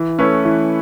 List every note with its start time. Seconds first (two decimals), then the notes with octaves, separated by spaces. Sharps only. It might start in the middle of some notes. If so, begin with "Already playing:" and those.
Already playing: E3
0.19 A3 C#4 E4 B4
0.45 E3